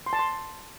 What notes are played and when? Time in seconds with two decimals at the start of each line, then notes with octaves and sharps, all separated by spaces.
0.06 C6
0.13 A5
0.19 C6